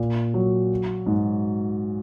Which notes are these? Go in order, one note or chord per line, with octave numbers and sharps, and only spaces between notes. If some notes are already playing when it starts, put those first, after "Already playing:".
Already playing: A#2
F#3
G#2